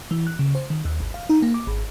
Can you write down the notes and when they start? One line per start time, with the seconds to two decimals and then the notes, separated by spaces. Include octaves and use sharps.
0.11 E3
0.27 F#6
0.39 C#3
0.55 C5
0.70 D#3
0.85 D#2
1.00 G#1
1.14 F5
1.29 D#4
1.42 A#3
1.54 D6
1.67 G#1